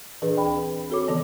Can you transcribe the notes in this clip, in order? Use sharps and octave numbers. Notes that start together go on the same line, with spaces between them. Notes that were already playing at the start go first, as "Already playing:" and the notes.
A#2 E3 D4 G#4 B4
D2 G5 B5
C4 F#4 A4 C#5 D6
C3 D#3 E3 B3